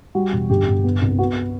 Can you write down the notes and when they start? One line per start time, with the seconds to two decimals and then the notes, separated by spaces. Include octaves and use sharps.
0.15 G3 F#4
0.32 E1
0.50 G1 G4
0.67 G1
0.84 B3
1.02 C2
1.19 B3 F#4